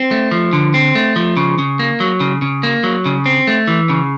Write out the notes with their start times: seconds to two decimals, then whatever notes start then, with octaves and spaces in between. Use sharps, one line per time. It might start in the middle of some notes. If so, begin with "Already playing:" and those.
Already playing: C4
0.11 A3
0.32 F3
0.53 D3
0.74 C4
0.95 A3
1.16 F3
1.37 C#3
1.58 C#3
1.79 A#3
2.00 F#3
2.20 C#3
2.42 C#3
2.63 A#3
2.83 F#3
3.06 C#3
3.26 C4
3.47 A3
3.67 E3
3.90 C#3